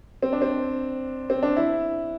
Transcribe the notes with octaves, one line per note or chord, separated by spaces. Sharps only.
C4
D4
C4
C4
D4
E4